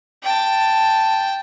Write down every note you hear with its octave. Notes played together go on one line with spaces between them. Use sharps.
G5 A5